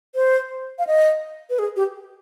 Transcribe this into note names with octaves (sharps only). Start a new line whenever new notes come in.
C5
F5
D#5
B4
G#4
G4